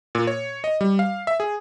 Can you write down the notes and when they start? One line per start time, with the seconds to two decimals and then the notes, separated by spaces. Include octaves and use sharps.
0.15 A#2
0.27 C#5
0.64 D#5
0.81 G3
0.99 F5
1.27 E5
1.40 G#4